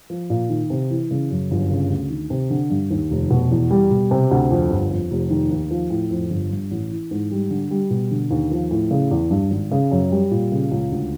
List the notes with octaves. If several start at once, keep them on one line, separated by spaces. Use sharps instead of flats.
F3
A#2
D#3
C3
E3
C#3
F#2
G1
C#3
D2
D#3
C3
D3
G2
D#2
F1
B2
E2
G3
B2
C3
D2
F2
G1
F2
F1
D#3
D#2
F3
A2
F2
G1
G2
A1
E3
G#2
G3
D3
G3
B2
D3
D#2
F3
A2
C#3
E2
G2
G#1
C#3
F#2
G3
A#2
C#3
C#2
D2